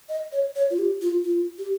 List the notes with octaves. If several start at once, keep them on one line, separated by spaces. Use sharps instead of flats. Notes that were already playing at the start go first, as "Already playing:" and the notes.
D#5
C#5
C#5
F4
G4
F4
F4
G4